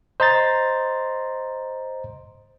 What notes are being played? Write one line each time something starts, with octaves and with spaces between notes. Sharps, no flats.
C5 D#5 A#5 C6 A6